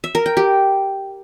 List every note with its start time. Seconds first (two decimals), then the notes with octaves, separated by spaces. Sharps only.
0.04 E5
0.15 A#4
0.26 G5
0.37 G4